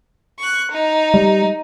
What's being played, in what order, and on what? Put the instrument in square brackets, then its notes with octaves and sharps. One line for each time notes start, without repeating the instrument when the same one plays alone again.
[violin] C#6 F#6
D#4
[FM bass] G3